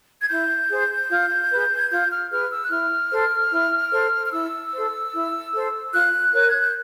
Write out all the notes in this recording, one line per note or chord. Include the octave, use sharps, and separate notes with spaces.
G#6
E4 G6
G#4 C5
F4
G#4 B4
G#6
F4 G6
F6
G#4 B4 F6
E6
F#6
E4 F6
A4 C5
E4
A4 C5
F6
E4 E6
A4 C5
E4
A4 C5
F4 F#6
A#4 C#5
G#6
G6